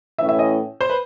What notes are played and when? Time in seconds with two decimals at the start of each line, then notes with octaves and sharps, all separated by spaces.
0.18 A2 E3 A3 C#4 E4 E5
0.29 E5
0.39 D#5
0.81 C5
0.90 B4